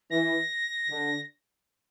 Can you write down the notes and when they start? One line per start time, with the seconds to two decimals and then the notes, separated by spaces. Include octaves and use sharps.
0.10 E3 A#6
0.89 D3